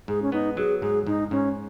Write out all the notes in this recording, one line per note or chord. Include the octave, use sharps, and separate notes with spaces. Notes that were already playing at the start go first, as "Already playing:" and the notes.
G#2 G#4
C#4
B3 D#4
F#3 G#4
G#2 G#4
G#2 D#4
G#2 C#4